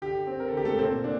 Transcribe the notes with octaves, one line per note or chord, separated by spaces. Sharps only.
D3 G4
C4
A#4
A4
D3 G4
A3 A4
A#2 C4 C5
A#2 D4